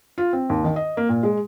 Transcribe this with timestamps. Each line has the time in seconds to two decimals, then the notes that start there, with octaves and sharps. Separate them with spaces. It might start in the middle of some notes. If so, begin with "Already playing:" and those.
0.18 F4
0.33 C4
0.50 D#2
0.64 D#3
0.76 D#5
0.97 A#3
1.09 A#2
1.23 G#3